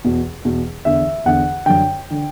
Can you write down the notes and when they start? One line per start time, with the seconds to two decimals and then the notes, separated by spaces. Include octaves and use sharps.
0.04 E2 B2
0.45 E2 B2
0.85 E2 D3 E5
1.26 E2 D3 F#5
1.66 F#2 D3 G5
2.11 D3